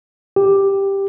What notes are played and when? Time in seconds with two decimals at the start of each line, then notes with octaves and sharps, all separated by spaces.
0.36 G4